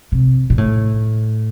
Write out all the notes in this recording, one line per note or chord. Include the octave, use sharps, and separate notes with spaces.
C3
A#2
A2